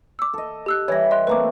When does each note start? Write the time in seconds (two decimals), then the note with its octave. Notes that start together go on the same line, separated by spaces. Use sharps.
0.19 D6 E6
0.34 A4 D#5
0.66 G4 E6 F#6
0.88 E3 G3 C#5 G#6 A#6
1.11 D#5 C6 F#6
1.27 A3 A#3 C4 B4 D6